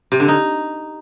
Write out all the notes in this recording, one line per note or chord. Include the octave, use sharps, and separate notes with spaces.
C3
D3
D#4